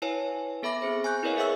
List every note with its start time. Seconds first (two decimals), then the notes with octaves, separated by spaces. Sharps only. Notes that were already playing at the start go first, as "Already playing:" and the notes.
0.02 E4 B4 C#5 F5 G#5 A5
0.63 B3 A4 E5 B5 D6 A#6
0.82 C4 G#4 C5
1.04 G#5 C#6 F#6 G6
1.23 E4 A#4 B4 C#5 D#5 F5
1.36 G#4 A#4 E5 F#5 C#6 E6